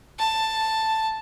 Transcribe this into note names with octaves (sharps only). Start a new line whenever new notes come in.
A5